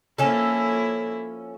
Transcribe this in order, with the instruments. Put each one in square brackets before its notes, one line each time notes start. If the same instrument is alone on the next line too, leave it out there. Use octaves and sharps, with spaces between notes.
[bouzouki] F3 C#4 A4 [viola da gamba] A#3 E4